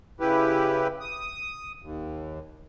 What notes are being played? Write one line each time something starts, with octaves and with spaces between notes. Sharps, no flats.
C#3 E4 G4 B4
D#6
D#2